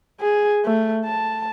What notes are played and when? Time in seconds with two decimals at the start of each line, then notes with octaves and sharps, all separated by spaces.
0.21 G#4
0.65 A3
1.06 A5